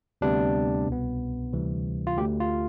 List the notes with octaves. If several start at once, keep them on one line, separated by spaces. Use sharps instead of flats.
D2 C3 G3 B3 D4
C2 B2 B3
D2 C3 E3 G3
F4
D2 D3 A3 G4
F4